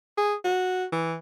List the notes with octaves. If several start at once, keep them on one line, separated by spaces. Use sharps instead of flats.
G#4
F#4
E3